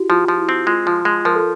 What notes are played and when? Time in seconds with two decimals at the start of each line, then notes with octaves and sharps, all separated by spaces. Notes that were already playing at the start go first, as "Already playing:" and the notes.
Already playing: E4 F#4 G4
0.10 F3 F4
0.28 F3
0.38 E4
0.49 C4
0.67 G#3 F4
0.86 F3 F4
1.05 G#3
1.25 F3 A#4
1.35 A4